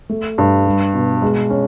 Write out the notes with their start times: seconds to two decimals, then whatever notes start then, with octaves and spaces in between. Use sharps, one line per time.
0.10 A3
0.38 G2
0.66 G3
0.94 B2
1.22 G#3
1.50 C#4